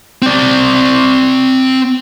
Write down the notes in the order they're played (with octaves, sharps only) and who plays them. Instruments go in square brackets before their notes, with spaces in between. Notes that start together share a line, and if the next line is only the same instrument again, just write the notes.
[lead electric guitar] C4 D5